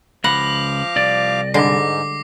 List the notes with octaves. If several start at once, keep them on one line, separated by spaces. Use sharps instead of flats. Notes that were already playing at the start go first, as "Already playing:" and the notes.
C#2 F3 F5 F#5 B5 D6 A#6
C2 D5
G#2 D3 G3 G#3 D6 A#6 C7